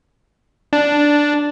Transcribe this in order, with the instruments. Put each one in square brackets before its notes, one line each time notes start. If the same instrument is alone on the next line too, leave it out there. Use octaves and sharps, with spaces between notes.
[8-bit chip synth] D4